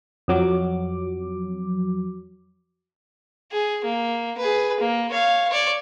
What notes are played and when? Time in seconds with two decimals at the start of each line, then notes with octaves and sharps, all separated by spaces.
0.28 F2 F#3 D6
3.52 G#4
3.84 A#3
4.38 G#4 B4
4.80 A#3
5.10 C#5 F5
5.49 C#5 D5